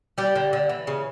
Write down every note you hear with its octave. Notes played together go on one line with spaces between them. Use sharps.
G3 G4
D3
D3
E3
C#3